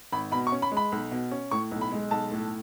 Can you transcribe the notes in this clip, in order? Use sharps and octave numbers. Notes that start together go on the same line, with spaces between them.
G#1 B5
B2 B5
C#6
C#4
B5
G#3
B5
B1
B2
C#4
A2 C#6
B1
B5
G#3
B1 A5
A2